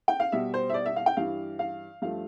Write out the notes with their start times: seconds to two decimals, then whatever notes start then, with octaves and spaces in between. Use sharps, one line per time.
0.08 G5
0.20 F5
0.32 B2 G3 E5
0.54 C5
0.69 E5
0.74 D5
0.86 E5
0.96 F5
1.06 G5
1.17 G2 E3 G3 F5
1.59 F5
2.02 G2 F3 A3 F5